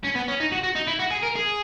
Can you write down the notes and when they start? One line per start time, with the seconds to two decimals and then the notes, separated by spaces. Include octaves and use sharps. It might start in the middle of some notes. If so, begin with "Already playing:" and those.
0.05 C#4
0.16 B3
0.28 C#4
0.40 D#4
0.52 F#4
0.63 F#4
0.76 D#4
0.88 E4
1.00 F#4
1.11 G#4
1.23 A#4
1.36 G#4